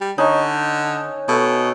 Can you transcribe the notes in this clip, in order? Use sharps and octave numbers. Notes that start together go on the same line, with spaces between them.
G3
D3 C#4 D#4
B2 A3 A#5